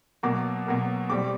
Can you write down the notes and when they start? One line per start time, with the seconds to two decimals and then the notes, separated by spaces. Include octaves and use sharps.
0.23 B2 F#3 A#3 D6
0.66 B2 F#3 A#3
1.10 B2 G3 C4 D6